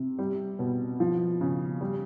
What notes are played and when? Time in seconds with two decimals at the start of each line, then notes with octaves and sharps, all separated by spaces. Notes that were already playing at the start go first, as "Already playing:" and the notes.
Already playing: C3
0.19 G3
0.59 B2
1.00 F3
1.41 C#3
1.81 G3